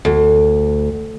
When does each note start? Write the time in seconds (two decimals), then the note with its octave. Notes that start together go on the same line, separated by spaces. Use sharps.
0.05 D2